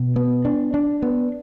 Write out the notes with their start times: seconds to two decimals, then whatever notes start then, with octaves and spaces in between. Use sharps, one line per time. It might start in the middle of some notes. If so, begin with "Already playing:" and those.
Already playing: B2
0.16 B3
0.45 D4
0.74 D4
1.02 B3